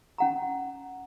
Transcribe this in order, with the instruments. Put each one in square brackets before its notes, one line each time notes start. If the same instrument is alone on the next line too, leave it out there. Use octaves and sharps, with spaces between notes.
[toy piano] C#4 F#5 A#5